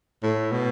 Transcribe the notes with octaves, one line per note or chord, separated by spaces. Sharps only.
A2
B2